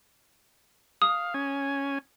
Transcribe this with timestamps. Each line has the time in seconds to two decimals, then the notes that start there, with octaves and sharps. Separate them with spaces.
1.02 F5 D#6
1.34 C#4 G#5